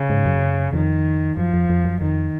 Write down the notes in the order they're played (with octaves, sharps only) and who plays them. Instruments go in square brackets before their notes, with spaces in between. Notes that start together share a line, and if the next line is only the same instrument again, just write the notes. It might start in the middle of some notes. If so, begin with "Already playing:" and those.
Already playing: [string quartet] C#3
[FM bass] G#2
F#2
[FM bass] F2 [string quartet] D#3
[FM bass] F#2 [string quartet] F3
[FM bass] F2
F2
F#2
[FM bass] F2 [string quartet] D#3